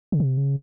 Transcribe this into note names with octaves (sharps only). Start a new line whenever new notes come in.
C#3
C3
C#3